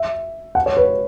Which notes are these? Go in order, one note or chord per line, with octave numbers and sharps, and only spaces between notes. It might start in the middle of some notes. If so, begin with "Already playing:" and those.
Already playing: E5
F#5
C#5
B4